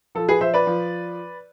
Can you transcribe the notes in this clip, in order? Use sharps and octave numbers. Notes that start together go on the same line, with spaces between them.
F3 A4
G#4 B4
F3 C5 E5
B4 D5
F3